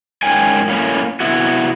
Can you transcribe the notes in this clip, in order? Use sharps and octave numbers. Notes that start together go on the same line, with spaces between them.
G#2 C#4 A#4 G5 G#5
A2 A#3 C#4
C3 B3 E4 F#4